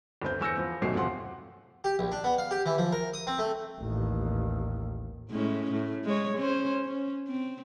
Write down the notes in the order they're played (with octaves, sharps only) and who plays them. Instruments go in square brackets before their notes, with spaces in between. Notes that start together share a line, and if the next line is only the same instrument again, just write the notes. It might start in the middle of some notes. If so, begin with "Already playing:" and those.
[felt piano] G1 D2 C4 G6
E2 E6 G6 A#6 C#7
F3 B3 C4
D#1 G#1 B2 F#3 A3 C7
D#1 C3 F3 F#5 C6
[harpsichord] G4
A#1
D4
B3
F5
G4
E3
F3
A#4
D#6
C4
A3
[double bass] A1 D#2
[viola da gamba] A2 G#3 C#4
A2 A3
G#3 C#5
C#4 C5
C#4
C4